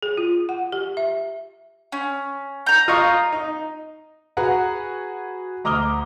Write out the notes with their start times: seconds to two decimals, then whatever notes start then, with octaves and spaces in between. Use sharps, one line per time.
0.02 G#4
0.17 F4
0.49 F#5
0.72 G4
0.97 E5
1.92 C#4
2.66 A#5 G6
2.88 F4 D#5 C#6
3.32 D#4
4.37 F#4 G#4 B4 F#5 A#5
5.64 D2 A#5 D6 D#6 F6 G7